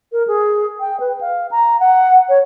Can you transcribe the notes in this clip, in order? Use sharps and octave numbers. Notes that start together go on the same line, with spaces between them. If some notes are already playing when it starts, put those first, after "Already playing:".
A#4
G#4
G5
B4
F5
A#5
F#5
C#5